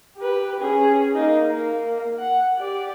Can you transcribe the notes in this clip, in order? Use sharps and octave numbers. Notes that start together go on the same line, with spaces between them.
G4 B4
C#4 G#4
A#3 D#4
A#3
F#5
G4 D5